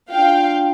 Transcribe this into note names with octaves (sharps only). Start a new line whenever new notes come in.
D4 F4 F5 G5